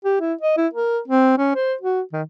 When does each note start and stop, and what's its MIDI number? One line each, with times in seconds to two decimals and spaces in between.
0.04 0.17 67
0.20 0.33 64
0.41 0.55 75
0.57 0.67 64
0.73 0.99 70
1.08 1.37 60
1.38 1.52 61
1.55 1.74 72
1.81 2.01 66
2.12 2.22 51